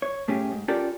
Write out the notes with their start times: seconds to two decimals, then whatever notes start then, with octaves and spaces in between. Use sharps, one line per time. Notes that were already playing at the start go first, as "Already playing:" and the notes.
0.02 C#5
0.28 A2 A3 C#4 G4 G#4
0.52 G#2
0.68 C#4 F4 G4 A4 A#4 D5